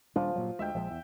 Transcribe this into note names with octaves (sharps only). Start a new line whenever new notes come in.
D#1 F3 G3 D4
G2 A#2 F#3
D2 G#3 E5 G5
A#1 F3 G#3
E2